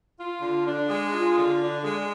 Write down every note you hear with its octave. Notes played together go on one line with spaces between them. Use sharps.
F4
D3
D4
G#3
F4
D3
D4
G#3